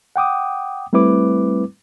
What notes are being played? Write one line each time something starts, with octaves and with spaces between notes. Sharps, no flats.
F#5 G5 D6 D#6
G3 A3 C4 E4 B4 D6